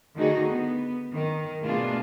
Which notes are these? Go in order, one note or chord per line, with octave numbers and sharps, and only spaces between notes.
D3 D#3 A3 D#4 F#4 G#4
B3
D#3
B2 A3 A#3 D4 F4 G#4